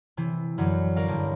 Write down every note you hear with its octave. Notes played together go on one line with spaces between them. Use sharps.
C3 E3
F#2 D3 E3 F#3
C#4 A#4 D5 F5 A#5
A#1 G2